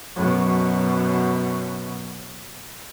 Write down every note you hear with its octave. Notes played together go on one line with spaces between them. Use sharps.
F#2 B2